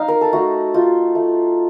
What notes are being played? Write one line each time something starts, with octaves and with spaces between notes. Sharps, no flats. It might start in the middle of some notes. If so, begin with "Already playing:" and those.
Already playing: D#4 F5
A#4
A4
A3 F#4
D#4 F4
A3